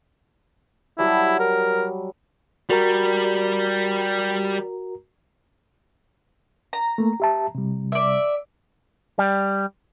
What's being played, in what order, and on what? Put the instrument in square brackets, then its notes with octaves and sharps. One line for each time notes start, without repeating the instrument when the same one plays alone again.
[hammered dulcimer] F#3 G3 A5 [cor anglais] E4
[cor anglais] A#4
[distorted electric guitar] G3 [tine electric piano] F#4 A#4 A#5
[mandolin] A#5
[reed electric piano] A3 A#3
G4 E5 A5
C3 G3
[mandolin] D5 E5
[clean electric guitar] G3